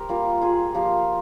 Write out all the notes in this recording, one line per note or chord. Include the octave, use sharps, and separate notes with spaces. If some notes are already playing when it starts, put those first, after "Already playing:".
Already playing: G4 A#4 C5
G3 A#3 F4
F4 G#4
F3 A#3 F4 G4 A#4